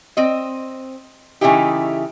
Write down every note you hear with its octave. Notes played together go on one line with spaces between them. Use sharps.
C4 D#5
C#3 E3 A3 D#4 E4 G4